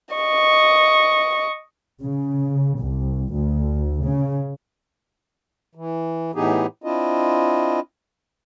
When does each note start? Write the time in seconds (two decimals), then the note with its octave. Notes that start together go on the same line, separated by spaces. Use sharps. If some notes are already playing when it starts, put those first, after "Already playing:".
0.15 D#5 C#6
1.99 C#3
2.79 C2
3.31 D2
4.02 C#3
5.75 E3
6.35 A2 E3 B3 D#4 G4 G#4
6.84 C4 D4 E4 F4 D#5